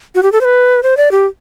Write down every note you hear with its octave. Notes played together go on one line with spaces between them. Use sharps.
F#4
G4
A4
C5
B4
C5
D5
G4